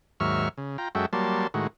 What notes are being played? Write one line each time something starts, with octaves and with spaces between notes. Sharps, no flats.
D#2 G#2 F#3 E5 C#6 F6
C#3
F4 G5 A#5
F#2 G#3 F#4 A4 E5 G5
F#3 G3 A#3 A5 C6
A2 D#3 G#3 F#4